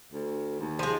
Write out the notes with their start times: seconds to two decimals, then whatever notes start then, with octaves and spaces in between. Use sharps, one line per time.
0.12 D2
0.60 D#2
0.79 F3 G#3